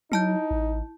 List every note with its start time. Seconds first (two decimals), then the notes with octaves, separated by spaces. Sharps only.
0.12 F#3 D#4 E4 A5 G6
0.51 A1